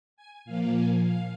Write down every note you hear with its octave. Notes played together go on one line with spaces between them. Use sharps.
G#5
A#2 F3 A#3 F5
G#5
F5